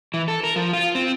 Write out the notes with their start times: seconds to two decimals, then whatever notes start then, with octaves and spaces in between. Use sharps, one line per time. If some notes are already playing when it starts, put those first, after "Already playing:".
0.14 E3
0.28 A4
0.43 A#4
0.56 F3
0.73 F4
0.95 C4